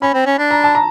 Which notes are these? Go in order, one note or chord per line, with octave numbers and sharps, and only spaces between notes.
C#4 B5
C4
C#4
D4
A#5
A5
A#5